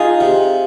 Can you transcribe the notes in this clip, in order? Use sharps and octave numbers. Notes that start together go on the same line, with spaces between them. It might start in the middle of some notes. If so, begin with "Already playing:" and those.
Already playing: D#4 F4 G#4
C3